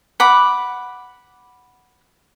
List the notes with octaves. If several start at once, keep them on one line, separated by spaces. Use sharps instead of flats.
F#5 B5 D6